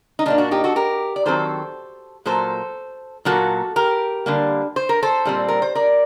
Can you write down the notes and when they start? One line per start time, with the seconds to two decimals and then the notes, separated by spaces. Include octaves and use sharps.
0.19 D#4
0.26 A#2 G3 A#3 D4
0.38 D4 F#4
0.51 D#4 G4
0.64 F#4 A4
0.76 G4 A#4
1.16 D5
1.26 D#3 F#3 C4 A4 C5
2.26 A#2 F#3 A#3 A4 C5
3.25 A#2 F#3 A#3 F#4 A4
3.76 G4 A#4
4.26 D3 G3 A#3
4.76 C5
4.89 A#4
5.03 A4 C5
5.25 A#2 G3 C4
5.49 A#4
5.62 C5
5.75 A#4 D5